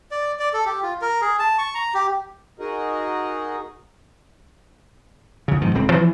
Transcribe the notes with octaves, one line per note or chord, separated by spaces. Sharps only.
D5
D5
A4
G4
F4
A#4
G#4
A5
C#6
A#5
G4
D#4 F#4 G#4 A#4 D#5
C#2 C#3
G#2 B2 D#3 F3
D#1 C#2 C4
E3 F3